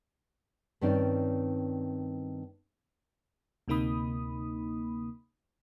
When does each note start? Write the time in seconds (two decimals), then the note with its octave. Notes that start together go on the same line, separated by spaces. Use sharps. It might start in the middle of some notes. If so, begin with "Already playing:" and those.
0.81 G2 D#3 C4 C#4 D5
3.68 D2 C3 A#3 D#4 B5 D#6